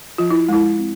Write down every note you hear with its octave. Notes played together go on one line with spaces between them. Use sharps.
F3 F4
E4
G#3 E4
C4